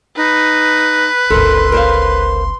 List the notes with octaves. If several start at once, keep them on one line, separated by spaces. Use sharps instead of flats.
D#4 B4
G1 C#2 A4 A#4 C6
A#4 C5 F5